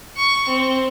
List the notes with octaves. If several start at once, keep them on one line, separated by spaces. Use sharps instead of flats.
C#6
C4